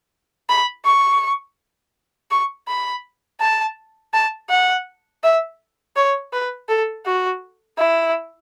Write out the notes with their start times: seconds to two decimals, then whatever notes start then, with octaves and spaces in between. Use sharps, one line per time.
0.49 B5
0.85 C#6
2.31 C#6
2.68 B5
3.41 A5
4.14 A5
4.50 F#5
5.23 E5
5.96 C#5
6.33 B4
6.69 A4
7.06 F#4
7.78 E4